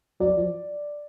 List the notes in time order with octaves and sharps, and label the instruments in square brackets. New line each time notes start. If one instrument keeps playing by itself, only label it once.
[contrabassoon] F#3 [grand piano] D5
[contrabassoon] F3